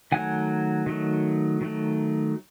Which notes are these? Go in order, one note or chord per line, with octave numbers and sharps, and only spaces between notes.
D#3 F#3 A3 F#5 G#5
D#3 F#3 A3
D#3 F#3 A3